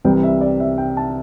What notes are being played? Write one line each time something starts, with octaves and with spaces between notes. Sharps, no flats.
C2 C3 E3 G3 G5
E5
D5
E5
G5
A5